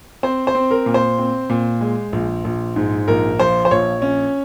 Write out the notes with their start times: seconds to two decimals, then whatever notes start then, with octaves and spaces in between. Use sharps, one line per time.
0.23 C4 C5
0.47 C5
0.55 C4
0.71 A#4
0.86 A#2
0.94 C5
1.18 C4
1.50 A#2
1.81 G#3
2.13 A#1
2.44 A#1
2.76 G#2
3.08 A#1 A#4
3.40 F3 C5
3.65 C5
3.71 A#1 C#5
4.02 C#4